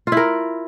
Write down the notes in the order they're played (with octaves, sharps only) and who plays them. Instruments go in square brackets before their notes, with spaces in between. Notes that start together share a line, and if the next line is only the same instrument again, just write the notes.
[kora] F4
E4
A#4